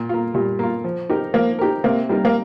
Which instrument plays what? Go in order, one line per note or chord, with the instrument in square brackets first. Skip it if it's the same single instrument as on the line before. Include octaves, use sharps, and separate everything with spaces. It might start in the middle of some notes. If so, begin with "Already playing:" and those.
Already playing: [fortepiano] A#2
A#3 F4
[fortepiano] A#2 [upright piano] G3
[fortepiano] A#3 F4
F3
D#4 G4 A#4
[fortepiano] F3 [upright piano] A#3
[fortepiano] D#4 G4 A#4
[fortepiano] C3 [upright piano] A#3
[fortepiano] G3 A#3 D#4 A#4
[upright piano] A#3